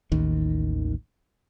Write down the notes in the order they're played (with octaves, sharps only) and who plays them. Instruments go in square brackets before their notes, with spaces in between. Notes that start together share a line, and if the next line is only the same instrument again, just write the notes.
[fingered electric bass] A1 D#2 D#3